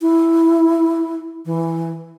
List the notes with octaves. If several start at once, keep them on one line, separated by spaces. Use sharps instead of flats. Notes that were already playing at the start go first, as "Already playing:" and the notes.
E4
E3